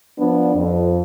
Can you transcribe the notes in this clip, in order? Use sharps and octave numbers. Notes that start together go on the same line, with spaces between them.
F3 B3 D4
F2